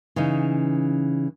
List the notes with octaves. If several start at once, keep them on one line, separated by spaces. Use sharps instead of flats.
C#3 E3 C#4 D#4